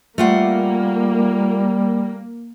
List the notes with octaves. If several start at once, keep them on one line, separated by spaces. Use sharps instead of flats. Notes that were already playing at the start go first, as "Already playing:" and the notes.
G3 A3 A#3 F4 F#5